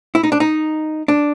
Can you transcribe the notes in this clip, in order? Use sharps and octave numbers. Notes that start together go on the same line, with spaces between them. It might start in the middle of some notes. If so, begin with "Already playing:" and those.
E4
D#4
D4
D#4
D4